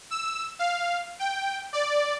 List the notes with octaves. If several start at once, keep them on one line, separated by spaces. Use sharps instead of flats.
E6
F5
G5
D5